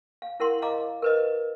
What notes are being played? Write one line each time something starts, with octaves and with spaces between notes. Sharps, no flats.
F5
E4 A#4 F#5 C6
D#5 F5 A#5 D6
A#4 B4 D#5